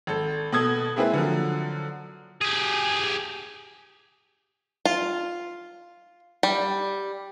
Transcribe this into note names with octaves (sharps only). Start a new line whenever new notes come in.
G#1 A4
B2 A4 D#6 G#6
G#3 A#3 C4 E4 G#4 B4
D3 F3 F#3
G4 G#4
F4
G3